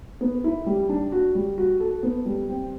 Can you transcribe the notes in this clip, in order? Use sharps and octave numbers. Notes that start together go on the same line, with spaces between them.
B3
E4
G3
D4
F#4
G3
F#4
A4
B3
G3
C4